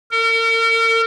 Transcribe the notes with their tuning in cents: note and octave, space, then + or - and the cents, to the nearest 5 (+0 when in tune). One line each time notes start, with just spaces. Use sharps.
A#4 -40